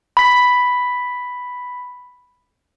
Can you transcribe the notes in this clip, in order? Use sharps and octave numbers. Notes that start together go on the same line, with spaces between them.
B5 B6